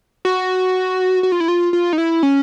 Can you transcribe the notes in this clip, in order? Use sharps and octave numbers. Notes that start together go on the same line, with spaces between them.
F#4
F#4
F4
E4
F4
F4
D#4
E4
C#4